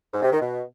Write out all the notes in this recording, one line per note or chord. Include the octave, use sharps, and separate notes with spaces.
G#2
C3
D#3
B2